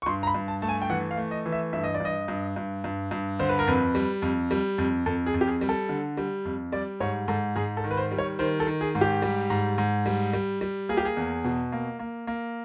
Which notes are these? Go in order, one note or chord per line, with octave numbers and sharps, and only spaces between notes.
C#6
G2 C6
A#5
B5
G2
A5
A3 A5
G#5
G5
E3 F#5
F5
A3
D#5
E3
E5
G2 E5
D#5
D5
G2 D#5
G2
G2
G2
G2
D3 C5
B4
A#4
F2 B4
G3
F2
G3
F2
F2 A4
G#4
F2
G4
G#4
G3
A4
D3
G3
F2
G3 D5
G#2 C#5
G#2 A4
G#2 G#4
A4
D#3
B4
C5
G3
C#5
D#3 C5
A4
D#3
G#4
G#2
G4
G3
G#2
G#2
G3
G3
G3
A#3 G#4
G4
G#4
E2
B2
A#3
A#3
A#3